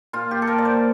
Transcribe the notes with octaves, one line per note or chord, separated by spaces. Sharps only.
A#2 F4
G4
A4
A#3 A#4
D5
C5